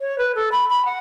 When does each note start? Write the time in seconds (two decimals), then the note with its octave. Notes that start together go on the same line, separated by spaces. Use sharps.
0.01 C#5
0.18 B4
0.35 A4
0.52 B5
0.69 B5
0.85 F#5